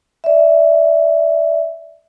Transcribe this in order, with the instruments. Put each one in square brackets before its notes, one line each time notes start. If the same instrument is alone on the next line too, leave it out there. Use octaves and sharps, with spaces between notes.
[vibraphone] D5 E5